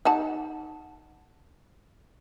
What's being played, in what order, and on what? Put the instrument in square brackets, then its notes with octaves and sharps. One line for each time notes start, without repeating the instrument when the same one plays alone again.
[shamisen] D#4 F#5 A5